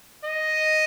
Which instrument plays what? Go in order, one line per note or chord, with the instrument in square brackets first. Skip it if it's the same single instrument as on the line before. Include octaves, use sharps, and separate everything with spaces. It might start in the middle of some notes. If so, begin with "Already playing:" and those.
[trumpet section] D#5